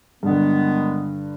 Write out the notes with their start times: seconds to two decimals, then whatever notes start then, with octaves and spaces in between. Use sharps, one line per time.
0.23 G2 D3 D#3 G#3 B3